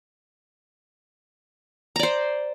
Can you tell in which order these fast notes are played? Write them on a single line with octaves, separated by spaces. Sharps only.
A#5 D5 C5